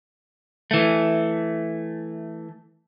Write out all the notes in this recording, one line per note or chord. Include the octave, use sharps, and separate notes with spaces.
E3 A3